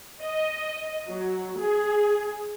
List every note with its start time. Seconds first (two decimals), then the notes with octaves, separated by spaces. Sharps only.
0.22 D#5
1.09 F#3
1.59 G#4